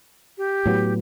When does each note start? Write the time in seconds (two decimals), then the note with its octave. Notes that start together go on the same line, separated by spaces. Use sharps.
0.38 G4
0.66 A2 F#3 B3